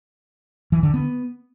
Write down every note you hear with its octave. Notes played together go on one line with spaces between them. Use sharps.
E3
D3
B3